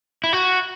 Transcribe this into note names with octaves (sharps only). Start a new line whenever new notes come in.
E4
F#4